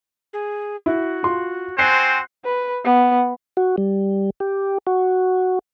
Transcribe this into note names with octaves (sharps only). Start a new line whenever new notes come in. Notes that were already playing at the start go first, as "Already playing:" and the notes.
G#4
E4 F#4
F4 C6
C4 F#4 C5 G#5 F#6 G6 C7
B4
B3
F#4
G3
G4
F#4